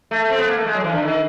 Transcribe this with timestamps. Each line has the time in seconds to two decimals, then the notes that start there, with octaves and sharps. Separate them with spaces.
0.11 A3
0.30 C4
0.38 B3
0.47 A#3
0.57 A3
0.66 G#3
0.74 F#3
0.84 E3
0.92 D3
1.03 D#3